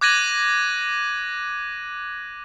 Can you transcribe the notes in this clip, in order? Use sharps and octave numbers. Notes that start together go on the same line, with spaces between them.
D6 F#6 G#6 A#6 D#7 F#7